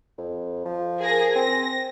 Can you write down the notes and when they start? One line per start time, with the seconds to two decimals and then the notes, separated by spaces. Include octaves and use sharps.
0.18 F2
0.66 F3
1.00 G#4 A#4 A#6
1.36 C4 A#6